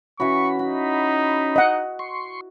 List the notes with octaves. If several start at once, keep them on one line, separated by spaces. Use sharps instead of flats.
E3 C#4 E4 F#4 B5 C#6
D#4 F#4
D#5 F#5
C6 C#6